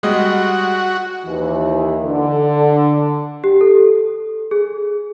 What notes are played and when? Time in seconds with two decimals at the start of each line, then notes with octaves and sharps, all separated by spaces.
0.03 G3 G#3 F#4 D#5
1.26 D#2 E3
2.05 D3
3.44 G4
3.61 A4
4.51 G#4